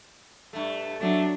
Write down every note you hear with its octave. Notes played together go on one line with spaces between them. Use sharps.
G2 A3
F#3 A3 D4